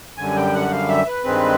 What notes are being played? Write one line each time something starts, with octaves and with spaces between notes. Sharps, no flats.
F#2 D3 G3 G#5
G5
F#5
F5
E5
B4
G2 D#3 G#3 C4